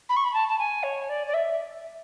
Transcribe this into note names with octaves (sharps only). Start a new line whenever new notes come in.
B5
C#6
B5
A5
A5
G#5
C#5
D5
D5
E5